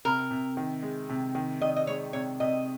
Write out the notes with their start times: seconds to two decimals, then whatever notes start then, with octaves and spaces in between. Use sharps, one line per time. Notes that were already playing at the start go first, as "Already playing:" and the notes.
0.05 C3 A#4
0.31 C3
0.57 D#3
0.83 G#3
1.10 C3
1.35 D#3
1.61 D#3 D#5
1.76 D#5
1.87 G#3 C#5
2.13 C3 C#5
2.40 C3 D#5